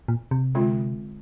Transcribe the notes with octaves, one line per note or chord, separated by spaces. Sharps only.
A#2
C3
D3 G#3 C4 F4